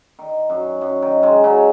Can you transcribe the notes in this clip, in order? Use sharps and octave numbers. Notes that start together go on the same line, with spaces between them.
D#3
F#2
F#2
D#3
D#3 G#3
C#3 F#3